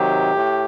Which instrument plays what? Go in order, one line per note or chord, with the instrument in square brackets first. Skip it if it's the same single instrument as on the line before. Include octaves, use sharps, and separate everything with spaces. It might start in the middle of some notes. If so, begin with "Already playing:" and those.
Already playing: [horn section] C3 D#3 F#3 G4
A2